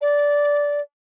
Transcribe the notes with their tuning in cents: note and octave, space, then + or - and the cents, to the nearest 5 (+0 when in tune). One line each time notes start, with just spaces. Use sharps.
D5 -15